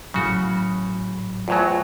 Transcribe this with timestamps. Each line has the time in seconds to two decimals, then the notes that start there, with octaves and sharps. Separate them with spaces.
0.14 G#1 A2 C#3 F#3 F#4 B5
1.48 E2 A2 F#3 F4 C5 G#5